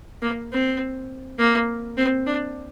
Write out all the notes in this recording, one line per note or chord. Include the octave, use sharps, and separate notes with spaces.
A#3
C4
A#3
C4
D4